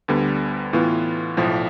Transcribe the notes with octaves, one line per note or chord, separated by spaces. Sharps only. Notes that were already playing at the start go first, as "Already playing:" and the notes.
D2 D3 G3 B3
A2 E3 B3 F4
B1 A2 F3